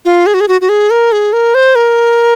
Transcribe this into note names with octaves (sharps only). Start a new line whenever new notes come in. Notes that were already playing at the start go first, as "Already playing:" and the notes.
F4
G#4
F#4
G#4
F#4
F#4
G#4
A#4
G#4
A#4
C5
A#4